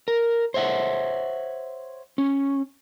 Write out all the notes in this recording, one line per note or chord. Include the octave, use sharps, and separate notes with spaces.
A#4
C5 C#5 E5 F#5
C#4